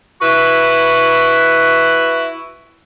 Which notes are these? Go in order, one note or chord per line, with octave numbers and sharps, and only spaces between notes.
E4 F#4 B4